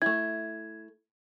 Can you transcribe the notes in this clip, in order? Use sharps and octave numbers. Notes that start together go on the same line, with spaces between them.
A3 E4 G#6